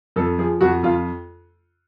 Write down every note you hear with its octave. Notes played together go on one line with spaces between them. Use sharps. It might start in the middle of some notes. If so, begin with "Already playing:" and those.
F2 A4
F3 G#4
F2 F#4
F2 F4